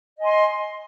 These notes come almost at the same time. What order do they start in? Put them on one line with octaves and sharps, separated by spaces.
D#5 G#5 C6